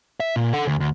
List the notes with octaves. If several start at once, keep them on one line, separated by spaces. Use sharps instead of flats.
E5
A#2
A4 F#5
D2
D2